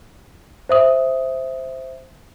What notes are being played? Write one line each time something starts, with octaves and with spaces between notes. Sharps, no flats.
C5 E5 D#6